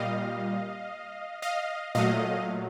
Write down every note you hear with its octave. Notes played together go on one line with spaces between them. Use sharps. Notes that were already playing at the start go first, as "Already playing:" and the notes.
Already playing: A#2 G3 D#5 F5
D#5 F5
A#2 F#3 A3 D#5 F5